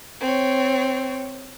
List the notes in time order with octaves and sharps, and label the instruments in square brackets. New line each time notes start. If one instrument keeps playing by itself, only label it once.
[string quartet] C4 C#5